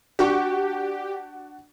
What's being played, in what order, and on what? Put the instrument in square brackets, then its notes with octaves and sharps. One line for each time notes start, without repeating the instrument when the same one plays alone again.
[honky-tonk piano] D4 F#4 C#6 [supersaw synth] G4